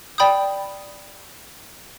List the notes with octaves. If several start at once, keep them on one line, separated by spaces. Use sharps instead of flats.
D5 G5 B5 D#6 G6